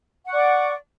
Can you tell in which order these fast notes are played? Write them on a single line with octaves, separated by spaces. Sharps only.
F#5 C#6 D5